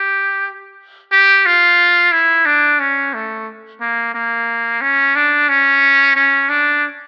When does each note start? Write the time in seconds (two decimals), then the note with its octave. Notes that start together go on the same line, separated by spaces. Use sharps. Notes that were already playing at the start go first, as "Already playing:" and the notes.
Already playing: G4
1.12 G4
1.46 F4
2.12 E4
2.46 D4
2.80 C#4
3.14 A3
3.81 A#3
4.15 A#3
4.82 C#4
5.16 D4
5.49 C#4
6.16 C#4
6.50 D4